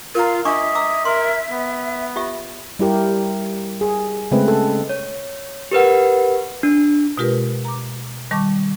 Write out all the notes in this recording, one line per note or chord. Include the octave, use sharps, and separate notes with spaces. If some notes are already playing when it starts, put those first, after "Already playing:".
F4 A#4 A#5
D4 D#5 E5 C#6 D6
A#5 D6 E6
A#4 C6
B3
F4 G4 E5
G3 E4 G4 A#4
G#4
C#3 G#3 A3 C4 B4
A4
C#5
G4 A#4 B4 F#5
D4
B2 G#3 F4 G4 A#4 B4
A#5 D6
D#3 G3 A5 C#6 D6